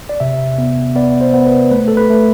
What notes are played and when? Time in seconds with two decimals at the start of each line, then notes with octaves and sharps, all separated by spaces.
0.09 D5
0.20 C3 E5
0.58 B3
0.96 B3 D5
1.21 C5
1.34 B3
1.46 B4
1.71 A3 B4
1.88 A4
1.97 B4
2.10 A3